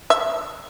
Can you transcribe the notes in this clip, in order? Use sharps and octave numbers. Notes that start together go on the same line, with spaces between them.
E5